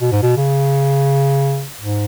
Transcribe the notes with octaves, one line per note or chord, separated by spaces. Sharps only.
B2
G#2
B2
C#3
G#2